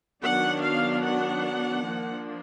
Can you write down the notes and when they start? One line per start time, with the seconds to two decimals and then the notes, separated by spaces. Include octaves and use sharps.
0.23 D#3 F#3 B3 D4 F#5
0.63 F5
1.05 F#5
1.85 F3 A#3 D4